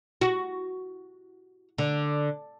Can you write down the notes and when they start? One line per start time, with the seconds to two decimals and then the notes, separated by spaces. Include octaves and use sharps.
0.21 F#4
1.78 D3